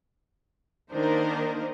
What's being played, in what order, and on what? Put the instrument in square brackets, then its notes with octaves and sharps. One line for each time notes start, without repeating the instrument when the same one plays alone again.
[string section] D#3 A#3 D4 D#4 A#4 C5